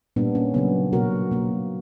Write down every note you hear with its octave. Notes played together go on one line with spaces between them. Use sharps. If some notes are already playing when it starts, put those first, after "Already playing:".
A#2 G3 A#3 B3 D4
A#3 C#4
C#3 F#3 A#3 B3
B2 F#3 A#3 F#4 A#4
B2 A#3